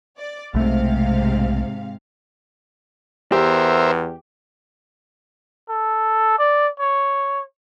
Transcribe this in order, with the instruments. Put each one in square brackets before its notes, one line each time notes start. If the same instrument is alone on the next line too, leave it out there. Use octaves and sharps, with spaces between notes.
[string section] D5
[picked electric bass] B1 A3 [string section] G#2 C3 F5
[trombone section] E2 B3 [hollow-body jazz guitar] G4 [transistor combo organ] A#4 C5 E5
[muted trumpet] A4
D5
C#5